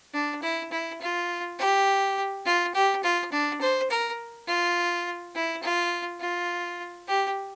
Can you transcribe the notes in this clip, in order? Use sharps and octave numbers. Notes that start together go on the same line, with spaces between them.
D4
E4
E4
F4
G4
F4
G4
F4
D4
C5
A#4
F4
E4
F4
F4
G4